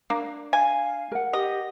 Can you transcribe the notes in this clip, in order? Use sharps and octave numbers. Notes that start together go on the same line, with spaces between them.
A#3 D4
F5 G#5
A#4 F#5
G4 D#5